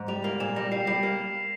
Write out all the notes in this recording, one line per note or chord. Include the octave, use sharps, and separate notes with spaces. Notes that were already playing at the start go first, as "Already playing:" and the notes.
Already playing: G#2
G3 F7
A#3
A#2 E7
G3 A#6
G3 C7
G3 C7
A#3